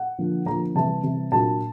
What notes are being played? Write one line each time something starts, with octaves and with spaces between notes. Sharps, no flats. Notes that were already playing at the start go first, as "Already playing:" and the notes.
Already playing: F#5
D3 F3 A#3
D3 F3 A#3 A#5
C3 E3 G3 A5
C3 E3 G3
A#2 F#3 A#3 D4 A5